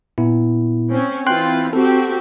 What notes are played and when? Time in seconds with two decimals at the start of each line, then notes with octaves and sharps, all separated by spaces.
0.18 A#2 B3 E4
0.91 C4 C#4
1.27 E3 C4 F4 G5 C6 F#6
1.73 C4 F#4 G4 A4